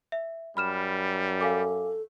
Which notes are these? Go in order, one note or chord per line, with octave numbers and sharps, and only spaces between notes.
E5
F#2 G3 B5 F6 E7
A4 F5 G#5 D6